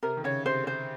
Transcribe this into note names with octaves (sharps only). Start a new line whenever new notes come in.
C3 A#4
D#3
C#3 C#5
C3 C5
C5